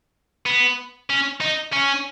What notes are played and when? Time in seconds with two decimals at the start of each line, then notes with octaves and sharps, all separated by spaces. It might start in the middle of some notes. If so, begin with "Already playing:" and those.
0.46 B3
1.10 C#4
1.41 D#4
1.73 C#4